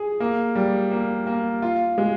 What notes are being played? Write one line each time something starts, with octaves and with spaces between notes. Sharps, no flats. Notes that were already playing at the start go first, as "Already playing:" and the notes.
Already playing: G#4
A#3
G3
A#3
A#3
F4
G#3